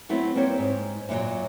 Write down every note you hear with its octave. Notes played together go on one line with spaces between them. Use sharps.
F#3 A3 B3 C4 E4
G3 A#3 C4 C5 C#5
G#2
F#2 A#2 E3 F#3